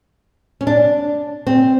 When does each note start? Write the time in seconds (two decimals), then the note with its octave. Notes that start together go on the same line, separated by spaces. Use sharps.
0.61 C#4
0.67 D4
1.47 C4